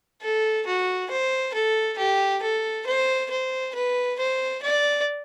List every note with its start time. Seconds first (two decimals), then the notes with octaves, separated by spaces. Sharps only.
0.22 A4
0.66 F#4
1.10 C5
1.54 A4
1.98 G4
2.42 A4
2.86 C5
3.31 C5
3.75 B4
4.19 C5
4.63 D5